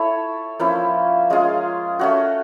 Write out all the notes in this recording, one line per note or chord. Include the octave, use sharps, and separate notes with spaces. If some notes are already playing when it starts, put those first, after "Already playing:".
Already playing: E4 A4 C#5
F3 A#3 C#4 E4
G#3 C#4 F4 G#4
A3 C#4 F#4